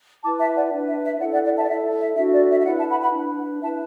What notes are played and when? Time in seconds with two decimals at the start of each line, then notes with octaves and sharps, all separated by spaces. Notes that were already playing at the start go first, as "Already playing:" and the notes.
0.23 E4 B4 A5 D6
0.39 E5 A5
0.56 D5 F#5
0.72 D4 B4
0.88 E5
1.05 E5
1.20 E4 D5 F#5
1.23 A4
1.33 D5 F#5
1.45 D5 F#5
1.57 E5 A5
1.63 D5
1.68 E4 A4 E5
2.01 E5
2.17 D4 F#4 A4 E5
2.34 D5
2.50 E5
2.61 E5
2.65 E4 B4 D5 F#5
2.78 E5 A5
2.90 F#5 B5
3.02 F#5 B5
3.14 D4 B4
3.62 E4 B4 E5 A5